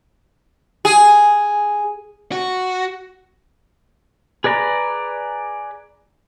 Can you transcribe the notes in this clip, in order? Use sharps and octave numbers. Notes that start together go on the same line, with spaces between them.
G#4
F#4
G#4 B4 D5 A#5 B5